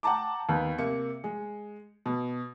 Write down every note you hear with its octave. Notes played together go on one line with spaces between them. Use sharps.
F#5 G5 A5 A#5 D6
D#2 B3
C3 A#3 C#7
G#3
B2